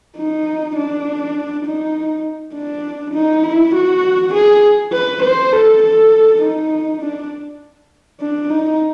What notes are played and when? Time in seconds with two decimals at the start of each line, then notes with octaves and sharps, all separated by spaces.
0.17 D#4
0.76 D4
1.65 D#4
2.54 D4
3.14 D#4
3.44 E4
3.75 F#4
4.34 G#4
4.93 B4
5.23 C5
5.53 A4
5.83 A4
6.42 D#4
7.01 D4
8.21 D4
8.50 D#4